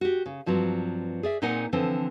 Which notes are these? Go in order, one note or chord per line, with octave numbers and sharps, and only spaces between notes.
F#4 G4
C#3
G2 F3 F#3 C4
G#4 D5 E5
A#2 C4 D#4 C5 F#5 G#5
D3 E3 F3 C4